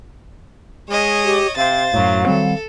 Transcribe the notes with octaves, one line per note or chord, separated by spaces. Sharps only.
G#3 C#5 D#5
G4
C3 C5 F5 A6
F#2 A2 F#3
D#3 G3 C4 A4